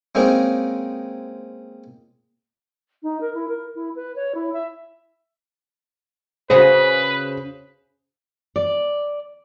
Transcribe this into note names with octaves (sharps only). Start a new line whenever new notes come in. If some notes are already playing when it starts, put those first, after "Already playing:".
G#3 A#3 C4 C#4 D#4
D#4
A#4
E4
A#4
E4
B4
C#5
E4
E5
C#3 F#4 G#4 B4 C5
D5